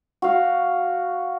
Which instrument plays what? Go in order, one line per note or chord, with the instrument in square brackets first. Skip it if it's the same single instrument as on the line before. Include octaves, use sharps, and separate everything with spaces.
[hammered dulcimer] F#4 F5